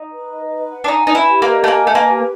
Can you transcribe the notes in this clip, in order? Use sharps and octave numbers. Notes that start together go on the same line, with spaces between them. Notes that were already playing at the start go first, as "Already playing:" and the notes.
Already playing: D#4
B4
D#5
B4
F#5
D4
D#4 G#5
D#4 B4
E4
G4
A#3
D#5
A3
A#3 G#5
A3 B4
A#3
G4